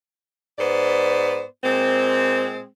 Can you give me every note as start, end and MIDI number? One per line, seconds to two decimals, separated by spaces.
0.59 1.44 44
0.59 1.44 59
0.59 1.44 72
0.59 1.44 74
1.64 2.65 46
1.64 2.65 56
1.64 2.65 60